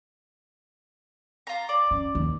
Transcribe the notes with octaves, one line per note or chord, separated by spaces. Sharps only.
F4 A#5
D5
C#4
D#2